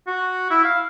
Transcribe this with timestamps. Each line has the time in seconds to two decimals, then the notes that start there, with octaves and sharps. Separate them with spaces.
0.07 F#4
0.50 E4
0.64 F5